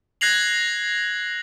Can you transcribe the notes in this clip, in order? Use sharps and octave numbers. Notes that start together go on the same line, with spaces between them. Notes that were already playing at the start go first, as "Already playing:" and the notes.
F#6 G#6 A#6 C7 F7 F#7